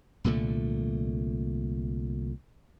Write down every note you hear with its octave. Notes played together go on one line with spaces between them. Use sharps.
C2 A#2 D3 A3